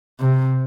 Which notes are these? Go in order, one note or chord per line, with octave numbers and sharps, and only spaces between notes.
C3